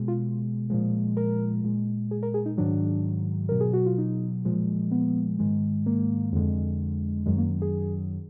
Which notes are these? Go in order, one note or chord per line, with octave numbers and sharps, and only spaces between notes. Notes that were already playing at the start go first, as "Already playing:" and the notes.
Already playing: B2 G#3
F4
A#2 F3 G#3
A#4
A#2 G#3
G#4
A#4
G#4
D#4
G#2 D#3 F#3 D4
B2 F#3 A#4
G#4
F#4
F4
D#4
A#2 F3 G#3
B3
G#2 D#3 G#3
A#3
F2 D3 G#3
F#2 D#3 F#3 G#3
A#3
G#4